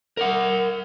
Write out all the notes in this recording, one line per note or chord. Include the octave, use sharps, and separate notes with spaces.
A#4 F#5